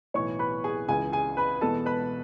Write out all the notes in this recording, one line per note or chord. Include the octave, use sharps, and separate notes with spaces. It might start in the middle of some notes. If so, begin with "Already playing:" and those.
B1 A2 E3 B3 C#5 C#6
B4 B5
G#4 G#5
C#2 C#3 E3 G#4 G#5
G#4 G#5
B4 B5
E1 E2 B2 G#3 B3 A4 A5
B4 B5